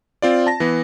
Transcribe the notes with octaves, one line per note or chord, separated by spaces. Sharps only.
C4 F4 D5
A5 A#6
E3 B3